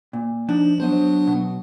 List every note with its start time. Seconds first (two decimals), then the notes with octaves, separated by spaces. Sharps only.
0.13 A#2
0.49 F3 D4 D#4
0.80 F#3 B3 D4 C5 D#5
1.27 B2